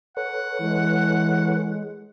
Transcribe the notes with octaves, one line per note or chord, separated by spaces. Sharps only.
A4 B4 C#5 F#5
E3 G#3